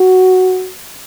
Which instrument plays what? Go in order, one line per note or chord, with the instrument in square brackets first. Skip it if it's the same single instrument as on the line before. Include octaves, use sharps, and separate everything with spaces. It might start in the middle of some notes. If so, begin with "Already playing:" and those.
Already playing: [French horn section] F#4